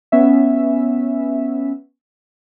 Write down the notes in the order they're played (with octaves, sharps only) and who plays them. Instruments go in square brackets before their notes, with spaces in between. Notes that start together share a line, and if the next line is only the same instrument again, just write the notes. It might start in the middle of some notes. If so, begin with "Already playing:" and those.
[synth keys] B3 C#4 E5